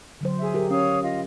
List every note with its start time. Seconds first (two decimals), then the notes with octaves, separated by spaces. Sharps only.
0.21 D3 F#3 C5
0.40 G#4 E5
0.54 G4 A#4
0.70 C#4 C#5 F5 D#6
1.03 F4 D#5 F5